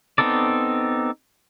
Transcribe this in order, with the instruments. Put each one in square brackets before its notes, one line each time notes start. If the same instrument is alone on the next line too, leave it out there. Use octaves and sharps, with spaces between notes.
[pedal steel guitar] B3 C4 D#4 A4 D5